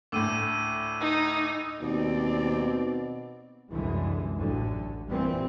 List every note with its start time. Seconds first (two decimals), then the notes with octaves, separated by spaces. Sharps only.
0.12 D2 A2 D6 E6 D#7
1.01 D#4
1.82 D#2 B2 C4 D5
3.72 C2 F#2 D3 E3 G#3
4.35 A1 D2 A2 D3 F#3
5.08 A#2 E3 G3 C4